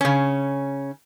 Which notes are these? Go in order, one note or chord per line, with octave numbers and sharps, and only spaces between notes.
C#3 C#4